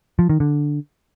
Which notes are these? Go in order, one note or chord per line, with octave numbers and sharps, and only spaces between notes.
F3
D#3
D3